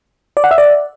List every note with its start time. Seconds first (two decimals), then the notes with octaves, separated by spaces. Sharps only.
0.37 D5
0.44 F#5
0.51 E5
0.58 D5